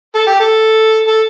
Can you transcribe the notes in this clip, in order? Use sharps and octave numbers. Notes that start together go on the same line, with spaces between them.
A4
G4
A4
A4